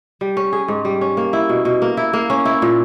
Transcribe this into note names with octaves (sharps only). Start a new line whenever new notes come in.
G3
C#4
G#4
G#2
G3
C#4
A#3
E4
B2
B2
A#3
E4
A#3
C#4
E4
A#2